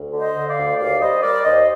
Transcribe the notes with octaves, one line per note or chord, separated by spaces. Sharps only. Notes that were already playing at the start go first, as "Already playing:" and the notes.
Already playing: D2
D3
C5 D#5
D3
D5 F5
D2
D#2 D5 F5
G3 C5 D#5
G3 A#4 D5
D#2 C5 D#5